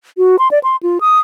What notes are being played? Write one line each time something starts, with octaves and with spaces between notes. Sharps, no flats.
F#4
C6
D5
C6
F4
D#6